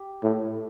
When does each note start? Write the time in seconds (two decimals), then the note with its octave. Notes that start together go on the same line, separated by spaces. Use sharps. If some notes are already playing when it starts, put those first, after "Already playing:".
Already playing: G4
0.23 A2